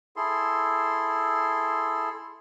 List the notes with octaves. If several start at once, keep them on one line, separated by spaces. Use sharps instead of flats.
E4 G#4 A4 C6